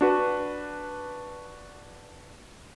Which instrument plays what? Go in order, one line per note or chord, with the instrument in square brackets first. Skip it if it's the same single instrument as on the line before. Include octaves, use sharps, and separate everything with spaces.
[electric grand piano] D4 F#4 B4